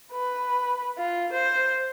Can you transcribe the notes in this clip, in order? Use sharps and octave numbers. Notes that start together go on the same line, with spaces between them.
B4
F4
C5